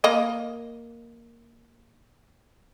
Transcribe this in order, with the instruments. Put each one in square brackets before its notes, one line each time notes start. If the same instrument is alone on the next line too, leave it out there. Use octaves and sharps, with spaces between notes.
[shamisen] A#3 D#5